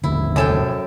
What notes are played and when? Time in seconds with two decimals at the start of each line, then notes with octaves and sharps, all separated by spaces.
0.04 G#1 D#2 D3 E4
0.36 F1 F#2 A4 G5 G#5 E7